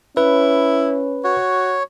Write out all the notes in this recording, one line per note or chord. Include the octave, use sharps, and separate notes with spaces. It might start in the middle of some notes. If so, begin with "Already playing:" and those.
C#4 E4 B4
F#4 C#5